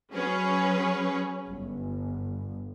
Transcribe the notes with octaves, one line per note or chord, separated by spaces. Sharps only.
F#3 C#4 G#4 B4 C#5
G1